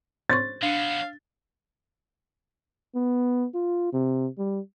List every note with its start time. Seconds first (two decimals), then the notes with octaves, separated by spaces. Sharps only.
0.29 C5 C6 C#6 A6
0.62 F#3 B3 D4 F5
2.95 B3
3.54 F4
3.93 C3
4.38 G3